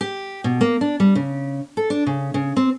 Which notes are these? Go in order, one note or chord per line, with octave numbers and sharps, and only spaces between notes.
G4
B2
A#3
D4
G3
C#3
A4
D4
C#3
C#3
C4